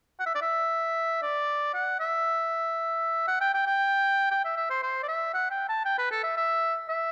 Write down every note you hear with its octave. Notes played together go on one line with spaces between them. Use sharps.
F#5
E5
D5
E5
D5
F#5
E5
F#5
G5
G5
G5
G5
E5
E5
C5
C5
D5
E5
F#5
G5
A5
G5
B4
A4
E5
E5
E5